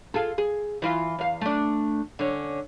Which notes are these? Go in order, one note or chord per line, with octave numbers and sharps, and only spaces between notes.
F4 G#4 A4
G#4
E3 E4 F4
E2 F5
A3 D4
D3 C#4